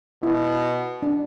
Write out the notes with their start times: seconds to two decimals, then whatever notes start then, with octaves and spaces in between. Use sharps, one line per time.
0.22 B2 E4
1.03 D4